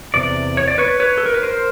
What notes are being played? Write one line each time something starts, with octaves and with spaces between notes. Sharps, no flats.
E2 C3 D5
C#5
D5
B4 C#5
B4 C#5
A4
A#4
B4
A#4 C5